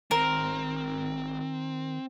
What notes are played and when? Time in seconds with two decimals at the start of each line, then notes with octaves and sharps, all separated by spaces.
0.11 G#1 D#3 C4 A#4